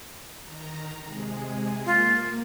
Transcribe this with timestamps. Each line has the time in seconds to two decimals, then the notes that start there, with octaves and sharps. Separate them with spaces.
0.43 D#3 A#5
1.06 C3 G#3 G#4
1.86 A#3 F4